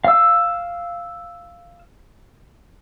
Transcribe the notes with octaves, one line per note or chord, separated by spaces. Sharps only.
F5 E6